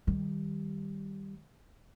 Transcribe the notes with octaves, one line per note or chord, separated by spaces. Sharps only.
D#3 G3